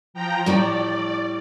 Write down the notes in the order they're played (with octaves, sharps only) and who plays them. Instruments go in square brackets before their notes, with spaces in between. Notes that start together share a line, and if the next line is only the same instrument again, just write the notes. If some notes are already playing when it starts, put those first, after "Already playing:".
[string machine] F3 G5 A#5
[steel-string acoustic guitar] A2 G3 A3 [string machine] D5